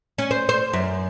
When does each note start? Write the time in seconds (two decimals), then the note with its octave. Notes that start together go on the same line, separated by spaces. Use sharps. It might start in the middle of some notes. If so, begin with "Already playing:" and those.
0.18 C#4
0.31 C5
0.49 C5
0.73 F#2